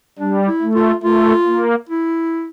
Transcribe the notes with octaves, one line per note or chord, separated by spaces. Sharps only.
G3 D4
E4
A3
F4
A3 F4
A#3
E4